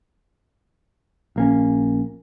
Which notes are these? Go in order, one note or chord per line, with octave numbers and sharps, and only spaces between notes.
A#1 A#3 C#4